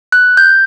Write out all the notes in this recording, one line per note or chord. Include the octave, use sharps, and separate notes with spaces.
F#6
G6